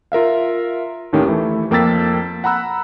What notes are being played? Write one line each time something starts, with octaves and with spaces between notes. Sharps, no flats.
F4 A#4 E5 F5
D#2 A2 D#3 C#4 G4
E3 A3 E4
F2 A#3 G5 E6 A6 B6
F#5 A#5 B5 E6 F#6